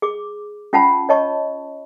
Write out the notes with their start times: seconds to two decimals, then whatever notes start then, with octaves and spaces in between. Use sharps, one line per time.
0.02 G#4 D6
0.73 C#4 F4 F#5 A5 B5
1.09 C#5 D#5 A5 C#6